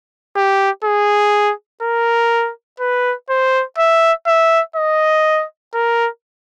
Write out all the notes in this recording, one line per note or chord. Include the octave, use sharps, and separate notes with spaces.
G4
G#4
A#4
B4
C5
E5
E5
D#5
A#4